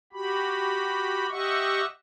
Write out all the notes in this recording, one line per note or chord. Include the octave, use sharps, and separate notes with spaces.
F#4 G4 B5
G4 D#5 E5 F#5 C#6